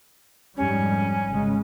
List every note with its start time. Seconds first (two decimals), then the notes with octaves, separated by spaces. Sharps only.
0.56 F2 G#2 G3 C#4
1.28 G#1 C#3 G#3